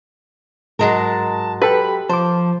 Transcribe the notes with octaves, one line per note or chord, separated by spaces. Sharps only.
G#2 F#3 G#3 A#4 A5
G4 A4 B4 G5 B5
F3 C5 A5 D6